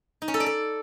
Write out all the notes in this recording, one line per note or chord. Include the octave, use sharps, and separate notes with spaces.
D#4
C#4
A4
D5
A4